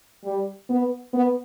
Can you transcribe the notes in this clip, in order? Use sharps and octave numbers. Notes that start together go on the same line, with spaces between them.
G3
B3
B3